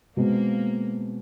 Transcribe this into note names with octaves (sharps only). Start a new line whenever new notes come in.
B2 G#3 A#3 C4